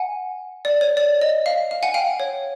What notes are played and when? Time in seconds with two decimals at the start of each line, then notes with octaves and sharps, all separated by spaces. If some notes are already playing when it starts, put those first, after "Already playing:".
Already playing: F#5 G#5
0.65 D5
0.81 C#5
0.97 D5
1.21 D#5
1.46 F5
1.71 F5
1.83 F#5 G#5
1.94 F5 G5
2.20 C#5